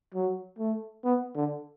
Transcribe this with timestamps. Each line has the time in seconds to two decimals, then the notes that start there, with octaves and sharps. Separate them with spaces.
0.14 F#3
0.59 A3
1.04 B3
1.36 D3